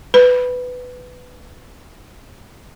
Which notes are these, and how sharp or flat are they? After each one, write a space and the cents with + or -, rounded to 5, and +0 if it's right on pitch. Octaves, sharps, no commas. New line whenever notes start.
B4 +15 B5 -10